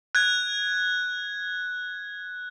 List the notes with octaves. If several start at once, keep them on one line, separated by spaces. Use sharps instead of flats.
F#6 G#6